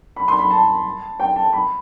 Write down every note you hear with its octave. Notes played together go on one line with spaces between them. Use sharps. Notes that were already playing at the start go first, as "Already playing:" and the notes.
B5
C6
B5
A5
G5
A5
B5